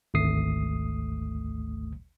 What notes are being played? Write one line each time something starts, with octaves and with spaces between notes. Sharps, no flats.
G#1 D2 A3 D#6 C7